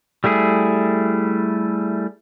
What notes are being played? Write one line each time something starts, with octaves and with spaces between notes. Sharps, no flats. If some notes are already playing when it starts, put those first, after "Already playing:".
G3 A3 E4 G#4